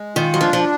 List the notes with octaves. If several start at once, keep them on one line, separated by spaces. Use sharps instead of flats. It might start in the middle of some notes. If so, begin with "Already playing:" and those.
Already playing: G#3
D#3 F4
F#3
F3 D4
F3